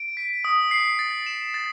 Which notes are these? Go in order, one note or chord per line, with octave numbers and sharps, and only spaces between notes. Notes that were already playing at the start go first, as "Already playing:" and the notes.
Already playing: D7
B6
D#6
C7
A6
E7
A6